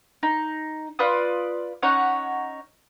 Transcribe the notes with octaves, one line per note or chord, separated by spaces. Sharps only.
D#4
F4 B4 D5 D#6
C#4 D#4 C#5 F#5